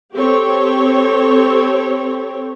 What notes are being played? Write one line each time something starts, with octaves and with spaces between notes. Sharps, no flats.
C4 G4 A4 C#5